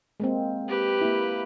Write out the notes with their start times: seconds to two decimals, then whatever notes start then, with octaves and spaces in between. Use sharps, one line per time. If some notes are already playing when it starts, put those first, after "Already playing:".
0.20 G#3 A#3 C4
0.68 G4 B4
1.01 A#3 E4